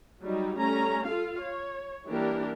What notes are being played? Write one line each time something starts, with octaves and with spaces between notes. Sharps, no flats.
F#3 G3 D#4
G3 A3 C#4 A#5
F4 A4 F5
C#5
E3 G3 A#3 D4 G4 A#4